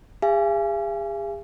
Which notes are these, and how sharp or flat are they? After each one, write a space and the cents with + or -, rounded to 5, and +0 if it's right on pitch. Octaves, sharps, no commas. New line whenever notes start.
G#4 -40 F5 -45 G#5 +5